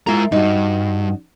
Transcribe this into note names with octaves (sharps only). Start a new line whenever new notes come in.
G#3 E4 F4 A#4 A#5
G2 D#4 F#4